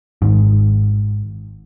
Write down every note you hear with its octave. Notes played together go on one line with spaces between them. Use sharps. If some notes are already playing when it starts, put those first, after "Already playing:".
G#1 G#2